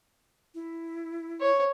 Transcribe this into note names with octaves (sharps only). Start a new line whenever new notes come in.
E4
C#5